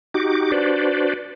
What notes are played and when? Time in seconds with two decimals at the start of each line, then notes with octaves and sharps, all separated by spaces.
0.14 D#4 F#4 G4 D6
0.52 D4 F#4 B4 C5 D5